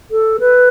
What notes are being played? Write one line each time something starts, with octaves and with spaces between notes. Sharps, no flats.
A4
B4